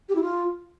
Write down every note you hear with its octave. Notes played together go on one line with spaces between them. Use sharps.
G4
E4
F4